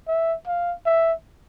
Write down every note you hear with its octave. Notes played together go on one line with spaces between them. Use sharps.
E5
F5
E5